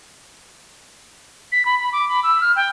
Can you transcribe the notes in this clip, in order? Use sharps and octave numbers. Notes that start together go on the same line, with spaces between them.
B6
B5
B5
D6
B5
E6
F6
G5